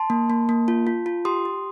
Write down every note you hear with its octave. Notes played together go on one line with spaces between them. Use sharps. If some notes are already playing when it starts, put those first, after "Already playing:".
Already playing: A5 C6
A#3
A#3
A#3
F4
F4
F4
G4 C6 D#6
G4